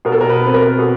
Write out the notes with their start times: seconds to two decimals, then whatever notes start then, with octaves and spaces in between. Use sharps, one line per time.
0.05 B2 A#4
0.12 A4
0.21 A#4
0.29 B4
0.42 C4
0.47 B4
0.54 A#4
0.78 B2 A4